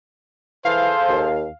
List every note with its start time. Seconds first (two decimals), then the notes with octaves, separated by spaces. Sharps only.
0.65 E3 G#4 A4 C5 F5
1.09 D#2